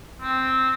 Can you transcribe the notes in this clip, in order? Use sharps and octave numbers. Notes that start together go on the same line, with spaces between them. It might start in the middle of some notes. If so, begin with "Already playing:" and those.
C4